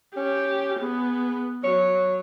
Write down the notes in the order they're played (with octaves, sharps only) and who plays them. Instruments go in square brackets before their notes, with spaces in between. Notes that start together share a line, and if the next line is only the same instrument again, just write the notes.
[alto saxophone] C#4 [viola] G4
[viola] B3 [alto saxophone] G#4
[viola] F#3 [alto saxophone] C#5